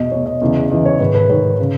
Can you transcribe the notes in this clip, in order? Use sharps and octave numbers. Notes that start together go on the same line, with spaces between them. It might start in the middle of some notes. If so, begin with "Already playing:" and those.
Already playing: E2 B2 D#5
E2 B2 C#5
D#5
E2 C#3 E3
E2 C#3 E3 D#5
C#5
G#2 D#3 B4
B4
G#2 D#3 C#5
C#3